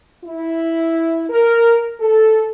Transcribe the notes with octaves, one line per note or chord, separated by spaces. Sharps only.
E4
A#4
A4